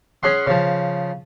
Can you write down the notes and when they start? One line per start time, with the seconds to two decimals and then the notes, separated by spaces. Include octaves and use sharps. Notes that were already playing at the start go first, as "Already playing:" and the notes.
0.23 C#4 G#4 F#5 C6
0.47 C#3 F3